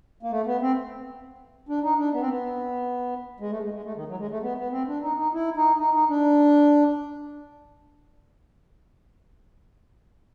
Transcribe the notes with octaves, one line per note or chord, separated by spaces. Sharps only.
A#3
A3
B3
C4
D4
D#4
D4
B3
C4
B3
G#3
A3
G#3
G#3
A3
D#3
F#3
G#3
A3
B3
B3
C4
D4
D#4
D#4
E4
D#4
D#4
D#4
D4